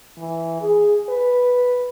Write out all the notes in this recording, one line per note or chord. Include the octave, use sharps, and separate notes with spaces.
E3
G#4
B4